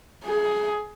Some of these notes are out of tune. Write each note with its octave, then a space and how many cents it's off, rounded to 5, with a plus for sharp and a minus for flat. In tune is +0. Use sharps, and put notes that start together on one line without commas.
G#4 +15